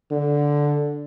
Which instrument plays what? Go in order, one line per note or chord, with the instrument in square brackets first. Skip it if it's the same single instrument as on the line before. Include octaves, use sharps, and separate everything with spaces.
[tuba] D3